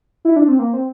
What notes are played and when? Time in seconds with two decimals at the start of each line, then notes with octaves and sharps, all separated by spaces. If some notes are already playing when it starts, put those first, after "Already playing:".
0.25 E4
0.36 D4
0.48 C4
0.59 A#3
0.73 C4